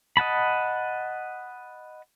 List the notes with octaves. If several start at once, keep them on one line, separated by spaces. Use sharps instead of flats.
D#5 F#5 A5 B5